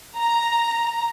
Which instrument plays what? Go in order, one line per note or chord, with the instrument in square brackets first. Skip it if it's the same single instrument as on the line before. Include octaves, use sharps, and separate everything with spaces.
[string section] A#5